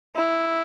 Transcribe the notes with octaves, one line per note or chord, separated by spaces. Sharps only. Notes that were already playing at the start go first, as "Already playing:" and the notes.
E4